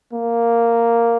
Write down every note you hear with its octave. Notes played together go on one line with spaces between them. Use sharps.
A#3